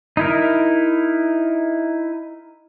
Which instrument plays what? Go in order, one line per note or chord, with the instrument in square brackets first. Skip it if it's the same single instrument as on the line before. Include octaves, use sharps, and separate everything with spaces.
[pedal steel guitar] D#4 E4 A#4